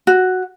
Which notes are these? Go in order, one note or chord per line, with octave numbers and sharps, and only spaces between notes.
F#4